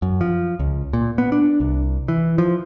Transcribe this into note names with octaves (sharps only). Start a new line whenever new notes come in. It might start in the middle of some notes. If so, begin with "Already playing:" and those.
F#2
F3
C#2
A#2
B3
D4
C2
E3
F3